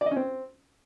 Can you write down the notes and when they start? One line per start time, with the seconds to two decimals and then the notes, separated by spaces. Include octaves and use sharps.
0.01 D5
0.06 D#5
0.11 C#4
0.16 C4